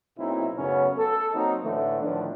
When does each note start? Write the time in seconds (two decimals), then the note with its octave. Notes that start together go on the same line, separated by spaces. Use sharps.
0.18 B1 A#2 C4 D#4 E4
0.58 F#2 C#3 A3 B3 C#4
0.98 A4
1.34 F#3 A#3 C4 D#4
1.64 A2 D3 E3 A3
2.01 A2 D3 D#3 F3 B3 D4